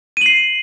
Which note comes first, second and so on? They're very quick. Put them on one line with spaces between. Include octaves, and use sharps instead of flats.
D#7 F#7 C7